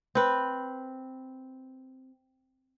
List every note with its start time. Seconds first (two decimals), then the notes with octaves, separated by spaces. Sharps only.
0.15 C4 B4